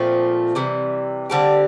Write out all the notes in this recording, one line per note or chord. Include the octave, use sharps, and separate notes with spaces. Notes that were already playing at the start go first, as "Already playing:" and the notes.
Already playing: A#2 F3 A3 C4
C3 E3 G3
D3 G3 C4 G4